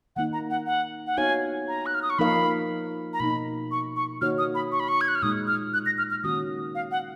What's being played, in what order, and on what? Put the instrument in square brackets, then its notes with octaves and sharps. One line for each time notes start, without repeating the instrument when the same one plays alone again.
[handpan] D#3 A#3 D#4 [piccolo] F#5
[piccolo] A#5
F#5
F#5
F#5
[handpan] B3 D#4 F#4 C#5 F5 [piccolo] G#5
[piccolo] A#5
F#6
F6
D#6
C#6
[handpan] F3 A#3 D#4 A#4 F5 [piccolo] B5
[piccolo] A#5
[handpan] B2 A#3 D#4 [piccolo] B5
[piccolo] C#6
C#6
[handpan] D#3 A#3 D#4 F#4 C#5 [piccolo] F6
[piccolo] D#6
B5
C#6
B5
C#6
G#6
F#6
F6
[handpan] A#2 G#3 D#4 [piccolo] D#6
[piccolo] F6
F#6
A#6
F6
F6
[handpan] D#3 A#3 C#4 F#4 [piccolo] D#6
[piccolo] F5
F#5